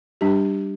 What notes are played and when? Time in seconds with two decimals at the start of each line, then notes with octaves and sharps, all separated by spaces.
0.21 G3 D4 G4